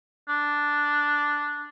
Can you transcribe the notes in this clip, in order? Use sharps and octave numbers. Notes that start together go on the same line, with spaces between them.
D4